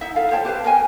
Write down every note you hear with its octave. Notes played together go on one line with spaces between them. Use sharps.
D#4 E4 E5 F#5
F4 A4 F5
C5 C#5 G5 A5
G4 B4 C5 F5
A#4 F5 G5 G#5